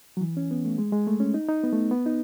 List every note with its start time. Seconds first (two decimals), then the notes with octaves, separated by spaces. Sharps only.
0.17 F#3
0.21 E3
0.37 C#4
0.51 B3
0.65 A3
0.78 G#3
0.92 G#3
1.07 A3
1.20 C#4
1.34 D#4
1.48 D#4
1.64 B3
1.73 A3
1.91 B3
2.06 D#4